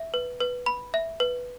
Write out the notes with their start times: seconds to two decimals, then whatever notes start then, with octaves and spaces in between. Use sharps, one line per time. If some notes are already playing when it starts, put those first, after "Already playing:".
Already playing: E5
0.14 B4
0.41 B4
0.66 B5
0.94 E5
1.20 B4